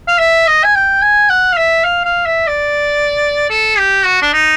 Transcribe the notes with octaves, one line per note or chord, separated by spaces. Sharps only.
F5
E5
D#5
G#5
G5
G#5
F#5
F5
E5
F5
F5
E5
D5
A4
G4
F#4
D4
D#4